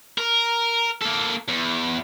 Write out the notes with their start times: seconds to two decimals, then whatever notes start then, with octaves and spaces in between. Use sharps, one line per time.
0.18 A#4
1.02 A#3 A4
1.48 E2